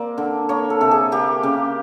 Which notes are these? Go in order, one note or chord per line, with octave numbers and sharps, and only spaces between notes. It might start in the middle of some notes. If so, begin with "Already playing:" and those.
Already playing: A#3 C4 D5
D3
A#3 C#5
A4
C3 A4
G#4
A#3 G4
C#3